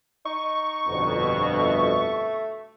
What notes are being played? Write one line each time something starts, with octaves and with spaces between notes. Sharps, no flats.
D#4 C#6
G1 F2 B2
A3